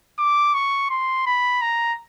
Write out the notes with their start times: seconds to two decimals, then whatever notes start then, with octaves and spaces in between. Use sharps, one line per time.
0.19 D6
0.54 C#6
0.90 C6
1.26 B5
1.62 A#5